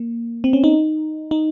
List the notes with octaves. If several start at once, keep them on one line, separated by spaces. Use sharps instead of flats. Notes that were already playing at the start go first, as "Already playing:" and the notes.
Already playing: A#3
C4
C#4
D#4
D#4